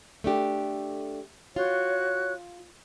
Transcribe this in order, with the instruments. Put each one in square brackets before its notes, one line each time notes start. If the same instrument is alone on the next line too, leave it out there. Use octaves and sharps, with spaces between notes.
[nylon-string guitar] A3 D4 G4
[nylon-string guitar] F4 [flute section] F#4 C#5 F#6